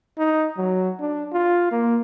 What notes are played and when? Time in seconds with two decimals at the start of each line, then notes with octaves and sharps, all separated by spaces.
0.18 D#4
0.57 F#3
1.00 D4
1.33 F4
1.71 A#3